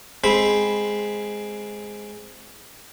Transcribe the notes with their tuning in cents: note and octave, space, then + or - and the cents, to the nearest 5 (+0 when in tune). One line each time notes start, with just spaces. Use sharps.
G#3 +0 C4 +0 B5 +0